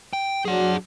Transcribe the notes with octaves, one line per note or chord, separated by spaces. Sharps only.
G5
F#3 D4 G#4 F#5